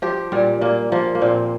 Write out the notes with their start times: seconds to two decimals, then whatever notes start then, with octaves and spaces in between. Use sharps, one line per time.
0.02 F3 G4
0.32 A#2 G3
0.61 A#2 A#3
0.92 F3 A#3
1.15 A#3
1.21 A#2 C4